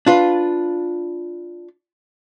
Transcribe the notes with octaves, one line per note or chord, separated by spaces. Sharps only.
D4 F4 B4